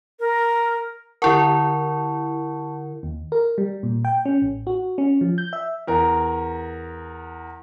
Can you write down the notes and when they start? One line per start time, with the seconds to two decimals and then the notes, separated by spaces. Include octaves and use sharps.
0.20 A#4
1.22 D3 E4 A#4 F#5 A5 C#6
3.03 D#2
3.32 A#4
3.58 G3
3.83 A#2
4.05 G5
4.25 C#4
4.42 A1
4.67 F#4
4.98 C#4
5.21 F3
5.38 G6
5.53 E5
5.87 E2 A#4